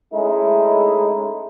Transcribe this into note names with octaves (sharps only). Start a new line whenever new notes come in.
G#3 A3 C#4 D#4 E4